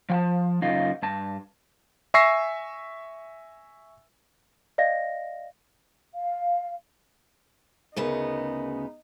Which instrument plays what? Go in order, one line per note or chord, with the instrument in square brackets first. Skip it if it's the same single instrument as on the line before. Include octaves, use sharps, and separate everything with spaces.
[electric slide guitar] F3 G5 A5
F#2 C#3 D#4 F4
G2 A5
[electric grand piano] E5 G#5 C#6 E6 A#6 C7
[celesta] D5 D#5 F5 A#6
[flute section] F5
[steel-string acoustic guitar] D2 C#3 B3 [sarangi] D#4 [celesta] G#4 A#4